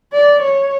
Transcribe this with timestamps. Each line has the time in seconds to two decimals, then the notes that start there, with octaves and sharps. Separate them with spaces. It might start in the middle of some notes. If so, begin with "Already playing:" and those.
0.13 D5
0.42 C#5